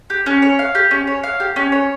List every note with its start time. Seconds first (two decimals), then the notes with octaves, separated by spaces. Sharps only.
0.10 G4
0.26 C#4
0.42 C#5
0.59 F5
0.75 G4
0.91 C#4
1.07 C#5
1.23 F5
1.40 G4
1.56 C#4
1.72 C#5